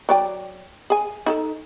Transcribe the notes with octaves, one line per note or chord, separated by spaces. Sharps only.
F#3 D5 G5
G#4 G#5
D#4 G#4 A4